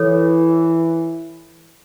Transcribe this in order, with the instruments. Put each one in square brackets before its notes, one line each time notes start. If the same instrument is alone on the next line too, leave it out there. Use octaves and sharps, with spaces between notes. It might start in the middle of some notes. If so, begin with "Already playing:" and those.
Already playing: [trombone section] E3 [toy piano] A4 C#5